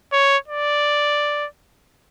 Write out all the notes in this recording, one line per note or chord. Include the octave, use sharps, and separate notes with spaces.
C#5
D5